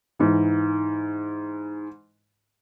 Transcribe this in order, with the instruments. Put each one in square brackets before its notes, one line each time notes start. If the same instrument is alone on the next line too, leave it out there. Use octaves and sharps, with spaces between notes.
[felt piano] G#2 E3